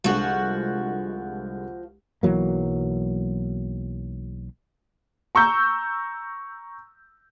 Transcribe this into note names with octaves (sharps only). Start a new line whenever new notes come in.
C2 D3 F3 G#3 F#4
B1 E3 F#3 A#3
A#5 C#6 E6 G6